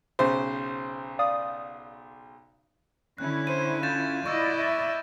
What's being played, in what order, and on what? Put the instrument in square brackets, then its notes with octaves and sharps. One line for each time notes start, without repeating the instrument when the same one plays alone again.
[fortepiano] B1 C#3 C5
[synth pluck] D5 F5 D#6
[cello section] D3 C#4 E4 [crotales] F#6
[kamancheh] C5 [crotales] D#7
[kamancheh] F4 [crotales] G6 A6 E7
[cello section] E4 D5 D#5 [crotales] C#6 E6
[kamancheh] E5